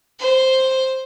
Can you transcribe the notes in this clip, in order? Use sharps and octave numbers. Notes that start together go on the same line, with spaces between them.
C5